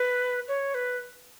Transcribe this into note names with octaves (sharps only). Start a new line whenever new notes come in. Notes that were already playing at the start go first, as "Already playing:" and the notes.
Already playing: B4
C#5
B4